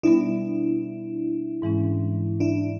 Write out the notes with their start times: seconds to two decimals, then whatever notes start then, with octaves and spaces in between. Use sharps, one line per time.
0.03 B2 G3 B3 D4 E4
1.62 G#2 E3 G#3 C#4
2.40 D4 E4